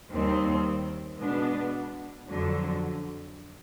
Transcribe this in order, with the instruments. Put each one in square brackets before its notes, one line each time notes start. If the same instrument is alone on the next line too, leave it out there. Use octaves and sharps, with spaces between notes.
[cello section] D#2 D#3 G3 C4
B2 G#3 B3 D4
F2 D3 F#3